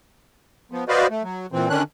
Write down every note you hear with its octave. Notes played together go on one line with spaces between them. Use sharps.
F3 B3
F#4 B4 C5 D5 D#5 F5
A3
F#3
A#2 E3 C4
D3 D#3 C#4 D4 F#6